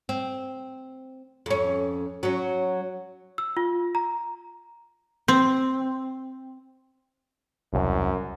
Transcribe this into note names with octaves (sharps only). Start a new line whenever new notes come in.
C4
F2 C#4
F#3 C#4
E6
F4
A#5
C4
E1 C2 F#2